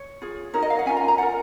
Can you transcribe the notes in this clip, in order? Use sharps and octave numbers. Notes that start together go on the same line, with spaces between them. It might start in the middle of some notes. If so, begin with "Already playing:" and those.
Already playing: C#5
F4 G#4
D#4 F#4 A#4 C#5
D#5
F5
F#5
C#4 F4 A#4 G#5
A#5
A#5
F4 A#4 F#5